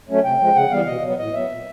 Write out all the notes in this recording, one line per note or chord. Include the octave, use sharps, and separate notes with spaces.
F#3 A3 C#4
C3 G5
F3 G#3
C#3 F#5
E3 G3 B3 F5
B2 D#5
F#3 B3
A2 D#5
F#3 B3 E5
A#2